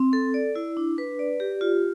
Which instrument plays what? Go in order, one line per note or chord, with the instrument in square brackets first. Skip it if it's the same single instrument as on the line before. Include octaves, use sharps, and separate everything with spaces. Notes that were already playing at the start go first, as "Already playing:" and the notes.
Already playing: [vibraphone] C4
A4
D5
E4
D4
B4
D5
G4
F4